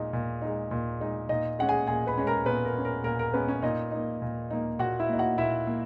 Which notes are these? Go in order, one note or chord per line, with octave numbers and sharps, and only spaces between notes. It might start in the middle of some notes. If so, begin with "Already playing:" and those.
Already playing: A#2 G#3 D#4
A#2
G#3 D#4
A#2
G#3 D#4
A#2 D#4 D#5
G#3 C#4 F#5
G#4 G#5
A#2 G#4 G#5
B4 B5
G#3 C#4
A#4 A#5
A#2 B3 B4
A#4
G#3 C#4
A#4
A#2 A#4
A#4
G#3 B3 C#4 B4
C#4 C#5
A#2 D#4 D#5
A#3 D#4
A#2
A#3 D#4
A#2 F#4 F#5
E4 E5
A#3 D#4
F#4 F#5
A#2 E4 E5
A#3